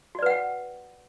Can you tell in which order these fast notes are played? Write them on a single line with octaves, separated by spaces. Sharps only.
F#4 D5 B4 F#5 G5